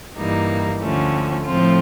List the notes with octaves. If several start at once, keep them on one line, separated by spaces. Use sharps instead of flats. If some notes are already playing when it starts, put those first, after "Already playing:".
G2 E3 G3 A#3 D#4
D2 D3 F3 A3 C#4
A2 F3 A3 C4 F4